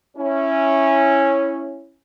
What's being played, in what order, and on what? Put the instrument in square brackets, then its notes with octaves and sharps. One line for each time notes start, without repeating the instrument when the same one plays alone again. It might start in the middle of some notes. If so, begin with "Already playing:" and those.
[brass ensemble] C#4 E4